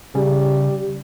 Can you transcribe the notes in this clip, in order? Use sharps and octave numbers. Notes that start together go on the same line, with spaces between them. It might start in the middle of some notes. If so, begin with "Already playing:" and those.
C#3 G3